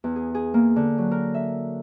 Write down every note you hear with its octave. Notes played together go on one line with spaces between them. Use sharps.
E2
G#4
G#4
A#3
D3
F#3
A#4
E5